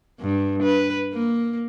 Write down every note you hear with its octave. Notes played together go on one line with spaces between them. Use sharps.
G2
B4
A#3